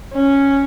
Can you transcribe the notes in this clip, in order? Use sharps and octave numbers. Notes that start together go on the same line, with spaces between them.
C#4